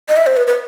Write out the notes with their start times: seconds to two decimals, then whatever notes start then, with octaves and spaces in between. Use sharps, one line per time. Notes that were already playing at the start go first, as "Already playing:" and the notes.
0.09 D#5
0.17 E5
0.27 C5
0.37 B4
0.47 B4